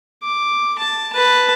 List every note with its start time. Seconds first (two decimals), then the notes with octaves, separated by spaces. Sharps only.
0.23 D6
0.79 A5
1.12 B4 A5